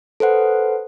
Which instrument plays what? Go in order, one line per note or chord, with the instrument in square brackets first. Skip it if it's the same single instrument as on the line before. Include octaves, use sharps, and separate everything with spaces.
[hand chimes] A4 B4 C5 F#5